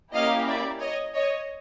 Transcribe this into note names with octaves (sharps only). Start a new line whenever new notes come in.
A#3 C#4 E4 G4 D#5 F5
D5 E5
C#5 D#5
C#5 D#5